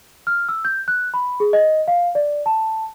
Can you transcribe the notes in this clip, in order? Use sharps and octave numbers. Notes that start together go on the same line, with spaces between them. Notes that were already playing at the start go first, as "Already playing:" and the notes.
F6
E6
G6
F#6
B5
G#4
D#5
F5
D5
A5